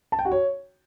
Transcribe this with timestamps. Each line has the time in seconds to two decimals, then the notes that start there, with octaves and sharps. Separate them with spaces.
0.12 A5
0.19 G5
0.25 F#4
0.32 C#5